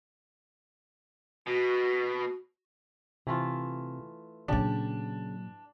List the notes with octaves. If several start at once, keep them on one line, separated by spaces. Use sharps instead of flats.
B2 F#4
C3 E3 A3 F4
A#2 C#3 F#3 D4 G4 D5